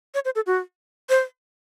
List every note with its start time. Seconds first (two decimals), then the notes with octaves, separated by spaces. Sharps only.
0.14 C#5
0.25 C5
0.35 A4
0.46 F#4
1.09 C5